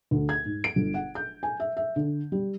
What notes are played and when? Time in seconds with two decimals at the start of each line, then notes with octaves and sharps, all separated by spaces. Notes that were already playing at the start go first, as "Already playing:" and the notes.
0.11 D2
0.29 G#6
0.45 G#2
0.64 D7
0.76 G1
0.94 F#5
1.15 G6
1.43 G#5
1.60 E5
1.77 E5
1.96 D3
2.32 G3